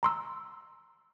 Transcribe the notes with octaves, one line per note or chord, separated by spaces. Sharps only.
A#5 C6 E6